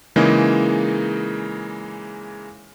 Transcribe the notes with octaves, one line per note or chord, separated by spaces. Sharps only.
C#3 E3 G#3 A#3 D#4